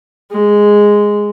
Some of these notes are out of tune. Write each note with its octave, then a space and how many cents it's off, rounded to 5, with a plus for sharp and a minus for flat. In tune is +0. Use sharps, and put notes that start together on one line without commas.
G#3 -5